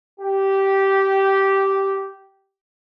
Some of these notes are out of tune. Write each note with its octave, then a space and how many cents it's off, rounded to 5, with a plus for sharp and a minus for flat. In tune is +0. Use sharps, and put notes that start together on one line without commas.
G4 -10